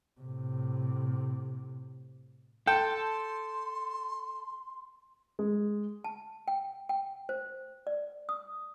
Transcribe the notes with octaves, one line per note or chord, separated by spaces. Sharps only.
A2 C3
A4 G5 C6
G#3
A5
G5
G5
C5
D5
D#6